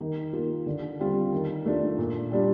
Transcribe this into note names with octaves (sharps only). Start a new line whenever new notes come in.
D#3
A#3 F4
D3
G3 C4 F4
D#3
A3 D4 F4
A#2
G3 D4 F4